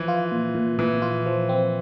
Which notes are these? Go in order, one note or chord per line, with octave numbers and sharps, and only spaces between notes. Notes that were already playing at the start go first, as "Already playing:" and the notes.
Already playing: E3 F3
F4
A#2
A#2
A#2 E3
F4
F3
C4